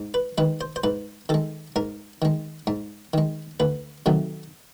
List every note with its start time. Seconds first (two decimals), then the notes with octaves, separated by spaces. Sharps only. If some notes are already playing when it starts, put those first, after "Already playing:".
Already playing: G#2
0.14 B4
0.38 D#3 G#3 B4
0.61 C5
0.76 C5
0.84 G#2 B4
1.29 D#3 G#3 A4
1.76 G#2 A#4
2.22 D#3 G#3
2.67 G#2
3.14 D#3 G#3
3.60 D2 B4
4.06 C3 D#3 F#3 A3